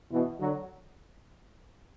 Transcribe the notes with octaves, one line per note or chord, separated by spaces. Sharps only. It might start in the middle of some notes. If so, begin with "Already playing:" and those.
B2 E3
D3 F#3